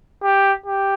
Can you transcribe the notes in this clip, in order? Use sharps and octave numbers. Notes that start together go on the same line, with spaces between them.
G4
G4